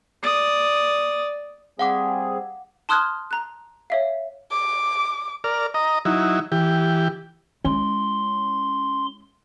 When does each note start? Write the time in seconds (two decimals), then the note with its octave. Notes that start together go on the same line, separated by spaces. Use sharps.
0.23 D5 D#6
1.79 G3 C4 G#4 F5 F#5 D6
2.89 A5 C6 D#6 F6 F#6 G#6
3.31 A#5 F#6
3.90 C#5 E5 F5
4.51 D6
5.44 A#4 D5 F6
5.74 D#5 A#5
6.05 F#3 D#4 E4
6.52 E3 G4
7.65 G#3 C#4 E4 C6